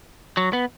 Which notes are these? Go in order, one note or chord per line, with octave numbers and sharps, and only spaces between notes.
F#3
B3